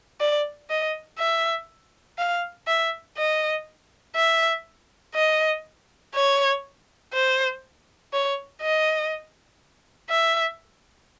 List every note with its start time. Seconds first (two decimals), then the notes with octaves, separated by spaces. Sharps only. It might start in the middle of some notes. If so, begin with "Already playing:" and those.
0.21 D5
0.70 D#5
1.19 E5
2.18 F5
2.67 E5
3.18 D#5
4.16 E5
5.15 D#5
6.15 C#5
7.14 C5
8.13 C#5
8.62 D#5
10.10 E5